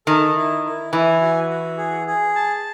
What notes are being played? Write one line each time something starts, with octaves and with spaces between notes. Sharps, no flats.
D#3 A4
E4
E4
E3 G#5
F#4
F#4
G#4
G#4
A5